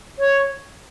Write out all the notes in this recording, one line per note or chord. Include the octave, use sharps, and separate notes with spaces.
C#5